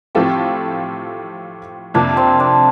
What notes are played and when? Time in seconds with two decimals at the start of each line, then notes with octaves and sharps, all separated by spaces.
0.15 A2 F3 C4 F4 G4 A4
1.94 F2 C3 F3 A#3 D4
2.17 C4
2.40 D4